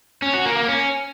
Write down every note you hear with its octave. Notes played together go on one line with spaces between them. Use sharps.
C#4
F#4
A#3
A#3
C#4